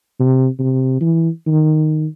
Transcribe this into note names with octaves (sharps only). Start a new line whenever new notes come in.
C3
C3
E3
D#3